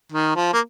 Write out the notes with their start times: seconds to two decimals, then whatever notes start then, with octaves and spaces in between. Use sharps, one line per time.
0.12 D#3
0.36 F3
0.53 A#3